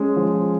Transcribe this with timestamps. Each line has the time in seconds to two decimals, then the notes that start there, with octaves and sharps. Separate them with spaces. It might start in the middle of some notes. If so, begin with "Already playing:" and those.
Already playing: G#3 C#4
0.16 F3